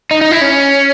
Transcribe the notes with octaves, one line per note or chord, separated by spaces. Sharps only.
D#4
D#4
E4
C#4